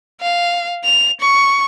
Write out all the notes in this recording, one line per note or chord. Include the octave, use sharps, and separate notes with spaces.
F5
F7
C#6